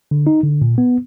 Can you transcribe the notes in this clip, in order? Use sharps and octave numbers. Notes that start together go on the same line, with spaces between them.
D3
D#4
D3
A#2
B3